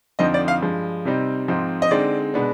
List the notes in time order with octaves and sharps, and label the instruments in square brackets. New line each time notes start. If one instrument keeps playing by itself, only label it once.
[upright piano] F2 D3 F3 C4 D#4 D#5
D5
F5
G2 F3 G#3
C3 G3 C4 D#4
G#2 F3 C4 D#4
D#5
D3 G#3 C4 D#4 D5
B2 G#3 B3 D4